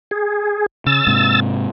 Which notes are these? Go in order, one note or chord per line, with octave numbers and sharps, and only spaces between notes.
G#4
C#3 E6 A6
G#2 C3